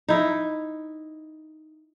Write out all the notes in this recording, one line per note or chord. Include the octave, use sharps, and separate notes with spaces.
D#4 E4